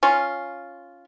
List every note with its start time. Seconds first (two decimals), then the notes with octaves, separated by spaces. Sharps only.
0.03 C#4 F4